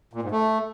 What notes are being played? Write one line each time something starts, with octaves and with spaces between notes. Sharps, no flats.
A#2
G#2
A3